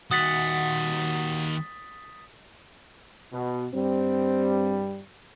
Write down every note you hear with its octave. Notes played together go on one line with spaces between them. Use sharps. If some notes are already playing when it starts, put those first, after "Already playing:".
D#2 F#4 F#5 D#6 A6 B6
B2
G2 G3 C4